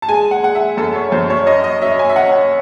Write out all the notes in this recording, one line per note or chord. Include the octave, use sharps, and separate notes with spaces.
A5
G#3 G#5
F#5
G#3 F#5
E5
F#2 A4
C#5
F#2 C5
C#5
C#4 D#5
D#5
C#4 E5
G#5
E5
C#4 F#5